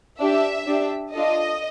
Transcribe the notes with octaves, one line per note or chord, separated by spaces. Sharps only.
D4 G4 E5
D4 G4
D4 F4 A4 D#5